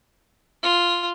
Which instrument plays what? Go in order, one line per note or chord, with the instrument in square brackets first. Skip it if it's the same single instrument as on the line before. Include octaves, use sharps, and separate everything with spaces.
[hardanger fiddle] F4